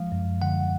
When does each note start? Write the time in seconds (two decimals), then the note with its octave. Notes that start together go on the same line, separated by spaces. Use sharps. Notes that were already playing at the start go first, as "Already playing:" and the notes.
Already playing: F3 G#3 F5
0.12 F#2
0.42 D3 F#5